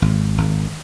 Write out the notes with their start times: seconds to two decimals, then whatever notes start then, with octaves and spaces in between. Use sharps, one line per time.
0.02 G#1
0.38 G#1